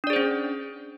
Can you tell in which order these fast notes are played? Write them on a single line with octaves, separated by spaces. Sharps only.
D4 D5 G#4 C5 C#4